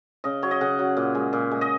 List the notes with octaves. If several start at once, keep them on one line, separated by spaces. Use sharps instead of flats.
C#3 D#5
F#3 C#5
D#5
C#3 F#5
F#3
A#2
G#3
A#2
G#3
D#5